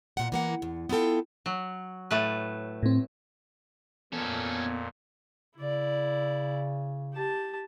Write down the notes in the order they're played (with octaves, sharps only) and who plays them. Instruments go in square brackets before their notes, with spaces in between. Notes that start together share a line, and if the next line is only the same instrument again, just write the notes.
[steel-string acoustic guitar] E2 A#2 F#5
E3 A#3 F#5
E2
B3 E4 F4 A4 G5
[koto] F#3
A2 A3 B4
[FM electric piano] A2 C4
[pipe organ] F2 A#2 [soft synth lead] B3 [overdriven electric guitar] C#4 A4
[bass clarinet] C#3 [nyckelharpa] E4 D5
[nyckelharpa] G4 A5